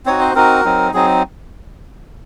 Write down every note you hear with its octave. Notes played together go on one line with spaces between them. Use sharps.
C4 D#4 F#4 C#5
C5
C4 D#4 F#4 A#4
F#3 C4 D#4
F#3 C4 D#4 G#4